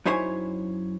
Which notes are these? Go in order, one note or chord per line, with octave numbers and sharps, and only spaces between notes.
F#2 D#4 E4 C5 C#5 G#5